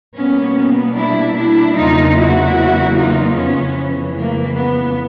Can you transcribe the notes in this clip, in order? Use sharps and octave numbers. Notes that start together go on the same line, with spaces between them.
B2 G3 A#3 B3 C#4
B3
D4 E4
D4 E4
E2 C#3 F#3 A#3 D#4 F4
E4 F#4
D#4 F4
F2 C#3 E3 B3 C#4
A#3
B3